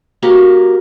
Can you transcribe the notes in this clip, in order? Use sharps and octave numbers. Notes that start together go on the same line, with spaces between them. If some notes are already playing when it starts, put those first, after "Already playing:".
A#3 F#4 G4 A#4